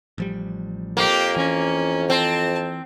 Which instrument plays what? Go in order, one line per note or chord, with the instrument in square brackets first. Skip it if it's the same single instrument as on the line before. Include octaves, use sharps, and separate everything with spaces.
[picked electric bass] A1 F3 G3
[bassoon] F2 [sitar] A#3 [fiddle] G4
[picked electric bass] E3 [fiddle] C#4
[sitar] C4 [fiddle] A5